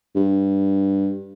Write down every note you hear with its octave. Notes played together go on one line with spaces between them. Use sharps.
G2